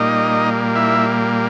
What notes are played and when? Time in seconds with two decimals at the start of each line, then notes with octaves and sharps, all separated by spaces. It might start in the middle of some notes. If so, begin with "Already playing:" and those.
Already playing: A#2 G3 A#3 D#4 D#5
0.76 E4 E5